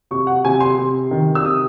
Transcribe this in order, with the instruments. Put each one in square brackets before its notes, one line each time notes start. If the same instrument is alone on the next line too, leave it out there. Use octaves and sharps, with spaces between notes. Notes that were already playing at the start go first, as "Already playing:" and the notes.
[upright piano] C3 C#6
F#5
C3 G#5
C6
C3
D#3
E6
C3 D#6